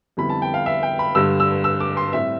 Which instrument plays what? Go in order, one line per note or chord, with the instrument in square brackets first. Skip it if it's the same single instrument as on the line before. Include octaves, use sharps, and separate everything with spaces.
[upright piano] F2 D3 G3 B3 E4 B5
A5
G5
F5
E5
G5
B5
G2 D3 G3 E6
E6
E6
D6
C6
A2 G3 C4 E5